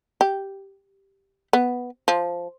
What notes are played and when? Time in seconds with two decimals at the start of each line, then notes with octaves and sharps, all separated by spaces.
0.21 G4
1.53 B3
2.08 F3